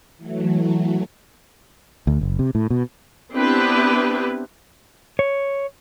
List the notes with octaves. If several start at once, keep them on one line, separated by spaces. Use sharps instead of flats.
E3 F#3 A3
D2
F#1
C3
A2
B2
B3 C4 D4 E4 G4 B4
C#5